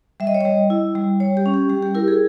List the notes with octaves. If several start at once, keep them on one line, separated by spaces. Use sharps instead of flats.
G3 E5
D#5
C#5
G3 D#5
E4
G3
G3 C#5
G4
C#4
G4
G3 G4
G4
E4 A#4
G#4